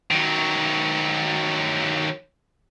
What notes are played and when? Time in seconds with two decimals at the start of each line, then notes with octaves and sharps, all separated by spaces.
0.11 D#3 F#3